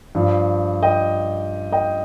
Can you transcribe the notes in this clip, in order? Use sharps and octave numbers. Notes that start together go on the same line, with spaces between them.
G2 F3
D#5 G5
D#5 G5